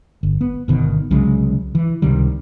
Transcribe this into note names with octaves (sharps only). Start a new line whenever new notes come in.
G1
B3
G1 B2 D#3
C2 C#3 F#3 G#3
E3
C#2 C3 D#3 G3